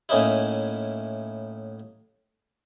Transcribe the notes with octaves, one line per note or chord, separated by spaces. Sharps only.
A2 A#3 C#4 D#4 E4